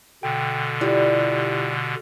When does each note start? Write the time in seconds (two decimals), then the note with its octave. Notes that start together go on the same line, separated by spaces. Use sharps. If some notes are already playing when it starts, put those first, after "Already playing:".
0.23 B2 D3 G5
0.81 G3 E4 F4 G4